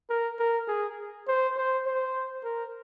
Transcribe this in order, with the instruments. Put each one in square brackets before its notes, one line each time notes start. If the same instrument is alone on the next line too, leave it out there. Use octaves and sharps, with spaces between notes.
[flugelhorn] A#4
A#4
G#4
C5
C5
C5
A#4